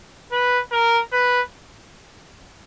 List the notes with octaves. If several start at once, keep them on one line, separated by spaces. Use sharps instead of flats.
B4
A#4
B4